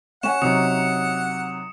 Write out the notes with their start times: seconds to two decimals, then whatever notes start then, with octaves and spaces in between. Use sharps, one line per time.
0.23 C#4 F#5 G#5 E7
0.42 C3 F#3 D#4 D#6 C#7